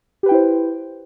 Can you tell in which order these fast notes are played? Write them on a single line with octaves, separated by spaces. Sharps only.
G4 B4 G5 E4 C5